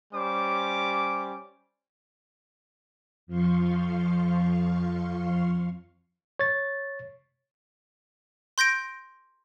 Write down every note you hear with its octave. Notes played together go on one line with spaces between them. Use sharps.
G3 C#4 C5 D6
F2 F3 F5 C6 C#6
C#5 A6
C6 G6 A#6 D7